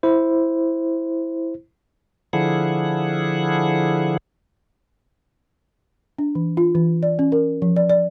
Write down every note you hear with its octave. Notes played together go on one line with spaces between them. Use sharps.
E4 C5
D3 F3 E4 G#4 F#5
D4
E3
F4
E3
D5
C#4
A#4
F3
D5
D5